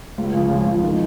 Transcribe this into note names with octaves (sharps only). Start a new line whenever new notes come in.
C#2
C#3 F3
C#2
C#3 F3
D#3